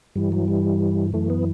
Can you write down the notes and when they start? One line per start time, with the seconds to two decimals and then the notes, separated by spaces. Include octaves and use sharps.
0.15 G2 E3 G3
0.32 F#3
0.48 G3
1.13 F#2 E3 A3
1.30 B3